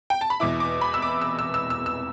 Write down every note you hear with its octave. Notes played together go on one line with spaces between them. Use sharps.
G5
A5
B5
E2 B2 B3 E4 D6
D6
B5
E6
D6
E6
E6
E6
E6
E6